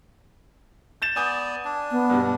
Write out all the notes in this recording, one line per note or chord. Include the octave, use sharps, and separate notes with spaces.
G6 A6 E7
B3 D5 G#5 D#6 G6
D4
B3
G2 B2 G3